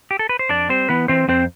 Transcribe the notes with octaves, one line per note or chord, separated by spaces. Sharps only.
G4
A4
B4
C5
F2 D4 D5
G3 C4 C5
E3 B3 B4
E3 C4 C5
F2 C4 C5